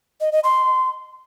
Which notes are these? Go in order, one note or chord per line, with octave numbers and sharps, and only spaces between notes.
D#5
D#5
C6